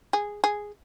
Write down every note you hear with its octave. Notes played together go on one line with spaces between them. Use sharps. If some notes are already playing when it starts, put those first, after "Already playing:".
G#4
G#4